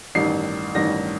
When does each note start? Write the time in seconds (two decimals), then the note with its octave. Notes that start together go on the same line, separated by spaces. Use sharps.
0.15 A1 G2 D#3 C7
0.75 A1 G2 D#3 A#6